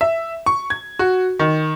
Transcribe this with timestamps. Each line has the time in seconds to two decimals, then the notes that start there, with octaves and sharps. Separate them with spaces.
0.01 E5
0.46 C#6
0.70 G#6
0.99 F#4
1.40 D#3